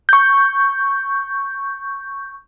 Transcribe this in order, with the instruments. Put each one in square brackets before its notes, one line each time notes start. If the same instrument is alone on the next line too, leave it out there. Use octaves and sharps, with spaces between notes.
[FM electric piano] C#6 G6